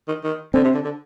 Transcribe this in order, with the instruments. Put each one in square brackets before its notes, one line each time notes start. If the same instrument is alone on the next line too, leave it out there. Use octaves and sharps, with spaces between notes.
[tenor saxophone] D#3
D#3
[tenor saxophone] D3 [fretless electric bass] C4
[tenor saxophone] C3
D3
D3